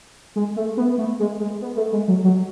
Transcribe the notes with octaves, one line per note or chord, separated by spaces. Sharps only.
G#3
A3
B3
A3
G#3
G#3
B3
A3
G#3
F#3
F#3